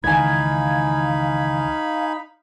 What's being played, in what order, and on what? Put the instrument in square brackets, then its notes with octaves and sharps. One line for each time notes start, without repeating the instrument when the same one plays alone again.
[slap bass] C#2 D#3 E3 [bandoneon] D#4 B5 [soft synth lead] F5 [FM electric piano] G#5 G#6